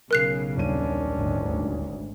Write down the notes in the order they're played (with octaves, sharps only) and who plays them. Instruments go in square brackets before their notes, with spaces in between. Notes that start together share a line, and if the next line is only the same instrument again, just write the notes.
[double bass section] B1 C#3 [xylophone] A#4 F#6 C7
[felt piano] D#1 D#7 [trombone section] D#3 C#4 D4
[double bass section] G#1 D2